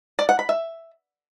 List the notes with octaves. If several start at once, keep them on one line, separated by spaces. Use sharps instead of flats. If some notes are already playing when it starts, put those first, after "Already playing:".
D5
F#5
B5
E5